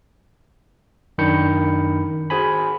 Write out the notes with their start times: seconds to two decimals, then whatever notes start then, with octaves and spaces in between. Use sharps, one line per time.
1.18 F#2 D#3 D4 B5 G6 C#7
2.30 F#4 G#4 C5 G#5 B5